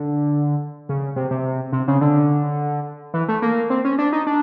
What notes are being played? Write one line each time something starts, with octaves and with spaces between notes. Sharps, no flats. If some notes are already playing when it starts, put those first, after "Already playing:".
Already playing: D3
C#3
C3
C3
C3
C#3
D3
E3
A3
A#3
C4
C#4
D4
D#4
D4